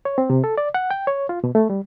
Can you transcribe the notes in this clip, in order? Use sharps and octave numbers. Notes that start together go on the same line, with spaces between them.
C#5
C4
C3
A4
D5
F#5
G5
C#5
F4
B2
A3
G3